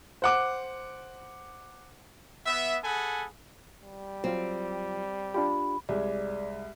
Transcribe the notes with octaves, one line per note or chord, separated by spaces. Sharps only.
C5 F#5 D6
B3 E5
G#4 A4 F#5 G#5 B5
G3
F#3 C4 F4
D4 F4 G4 B5
C2 G#3 D5